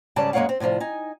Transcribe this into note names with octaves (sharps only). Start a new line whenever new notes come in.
G#2 C#3 G3 D5 A5
F#2 G#3 A#3 C#5 F5 F#5
C4
A2 C3 E3 F3 G3
D#4 G#5